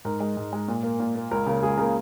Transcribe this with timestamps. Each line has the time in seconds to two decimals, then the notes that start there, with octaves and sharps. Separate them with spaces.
0.05 G#2 A#4
0.20 G#3
0.37 G#2
0.53 G#3
0.68 A#2
0.83 A#3
1.00 A#2
1.16 A#3
1.31 C#2 A#4
1.47 C#3 A#3
1.62 C#2 G#4
1.77 C#3 A#4
1.81 A#3